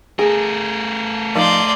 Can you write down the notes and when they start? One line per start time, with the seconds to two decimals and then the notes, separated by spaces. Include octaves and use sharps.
0.19 A3 G#4 A#4
1.36 F3 D#4 D5 C6